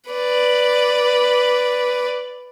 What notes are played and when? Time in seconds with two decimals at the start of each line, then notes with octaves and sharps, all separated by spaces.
0.10 B4 D5